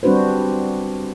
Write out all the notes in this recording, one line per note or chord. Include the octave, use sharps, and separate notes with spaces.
G3 C4 D4 F#4 B4 C5